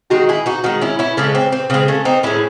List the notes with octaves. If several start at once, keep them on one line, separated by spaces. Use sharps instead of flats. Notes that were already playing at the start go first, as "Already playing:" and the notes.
D#3 G#3 D#4 F#4
E4 G#4
D#4 F#4
D#3 G#3 D#4 F#4
C#4 E4
C#4 E4
C#3 G#3 A3 C#4
C4
C4
C#3 G#3 C4
A3 C#4
C4 D#4
A2 G#3 C#4 E4